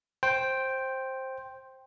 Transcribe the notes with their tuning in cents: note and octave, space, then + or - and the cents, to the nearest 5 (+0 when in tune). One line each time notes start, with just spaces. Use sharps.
C5 +10 G5 +0